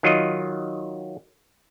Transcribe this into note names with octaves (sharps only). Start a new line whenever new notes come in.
D#3 F#3 F4 D#5